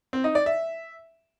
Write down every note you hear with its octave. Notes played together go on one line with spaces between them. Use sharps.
C4
D#4
D5
E5